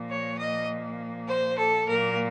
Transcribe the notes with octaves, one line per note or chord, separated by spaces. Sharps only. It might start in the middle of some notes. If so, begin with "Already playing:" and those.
Already playing: A#2 F3 A#3
C#5
D#5
C5
A4
A#2 F#3 A#3 A#4